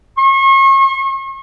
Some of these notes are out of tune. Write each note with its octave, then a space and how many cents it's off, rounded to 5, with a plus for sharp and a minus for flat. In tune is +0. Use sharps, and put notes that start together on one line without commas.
C#6 -40